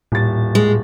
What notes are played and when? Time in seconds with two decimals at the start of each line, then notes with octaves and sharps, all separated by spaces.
0.12 D#1 A2 A6
0.55 G#3